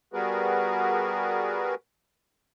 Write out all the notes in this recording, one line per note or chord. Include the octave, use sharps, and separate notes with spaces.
G3 B3 F#4 G#4 A#4 B4